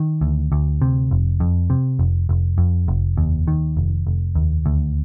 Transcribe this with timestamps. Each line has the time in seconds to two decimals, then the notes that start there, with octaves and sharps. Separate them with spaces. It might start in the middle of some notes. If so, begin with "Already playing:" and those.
Already playing: D#3
0.21 D2
0.52 D2
0.82 C3
1.11 F1
1.40 F2
1.70 C3
1.99 F1
2.29 F1
2.58 F2
2.88 F1
3.17 D#2
3.48 D#3
3.77 F1
4.07 F1
4.35 D#2
4.66 D2